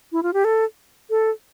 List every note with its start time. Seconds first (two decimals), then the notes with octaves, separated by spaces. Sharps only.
0.12 E4
0.23 F4
0.33 G4
0.44 A4
1.10 A4